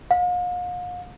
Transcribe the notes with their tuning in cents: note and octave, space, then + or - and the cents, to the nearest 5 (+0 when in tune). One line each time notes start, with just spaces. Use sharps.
F5 +45